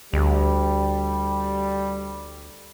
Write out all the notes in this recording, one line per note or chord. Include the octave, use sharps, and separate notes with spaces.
D2 G3